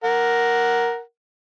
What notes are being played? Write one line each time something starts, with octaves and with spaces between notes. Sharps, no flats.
A#4 F#5